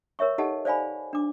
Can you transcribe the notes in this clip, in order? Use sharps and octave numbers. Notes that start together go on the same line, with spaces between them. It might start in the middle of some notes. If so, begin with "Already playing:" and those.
A#4 C#5 E5 C#6
D#4 G4 A4 D#5 F#5 A5
C5 D5 F5 G#5 B5
D4 D6